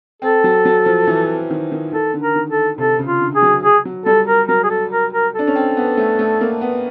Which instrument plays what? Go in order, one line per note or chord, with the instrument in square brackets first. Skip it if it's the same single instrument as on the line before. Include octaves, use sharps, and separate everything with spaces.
[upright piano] C4 [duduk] A4
[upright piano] F#3
F#3
F3
E3
D#3
D#3
[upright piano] D#3 [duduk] A4
[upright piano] D3
[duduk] A#4
[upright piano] D#3
[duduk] A4
[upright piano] C3 [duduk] A4
[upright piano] C#3
[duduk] F4
[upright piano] D3
[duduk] G#4
[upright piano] F#3
[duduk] G#4
[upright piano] F#3
[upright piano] G3 [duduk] A4
[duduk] A#4
[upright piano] F#3 [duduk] A#4
[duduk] G#4
A4
A#4
A#4
[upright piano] D4 [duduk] A4
[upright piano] C#4
C4
B3
A3
A3
A#3
B3